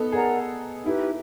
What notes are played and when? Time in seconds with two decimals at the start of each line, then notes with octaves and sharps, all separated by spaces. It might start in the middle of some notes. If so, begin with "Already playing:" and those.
Already playing: B3 D#4 A4
0.12 G#4 A#4 D5 F#5 A#5
0.85 D#4 E4 G4 B4